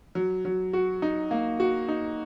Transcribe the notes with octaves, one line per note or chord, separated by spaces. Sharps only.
F#3
F#3
F#4
D#4
A#3
F#4
D#4